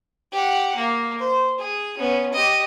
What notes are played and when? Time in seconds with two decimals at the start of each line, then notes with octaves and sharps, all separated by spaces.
0.32 G4 F#5
0.75 A#3
1.19 C5
1.58 G#4
1.97 B3 C#4
2.33 G4 D#5